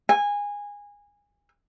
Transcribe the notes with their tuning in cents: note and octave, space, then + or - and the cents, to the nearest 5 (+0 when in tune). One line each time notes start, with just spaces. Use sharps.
G#5 -20